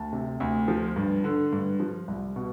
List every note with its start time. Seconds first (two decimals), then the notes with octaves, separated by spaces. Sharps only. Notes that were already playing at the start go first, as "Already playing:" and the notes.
Already playing: D2 A5
0.13 C3
0.40 D2
0.68 F3
0.96 G2
1.24 D3
1.52 G2
1.80 F3
2.08 C2
2.36 B2